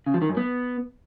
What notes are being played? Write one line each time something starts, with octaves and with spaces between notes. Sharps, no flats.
C#3
F3
D#3
F#2
B3